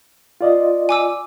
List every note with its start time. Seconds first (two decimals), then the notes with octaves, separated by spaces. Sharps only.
0.41 F4 D5 D#5
0.89 G#5 D6 E6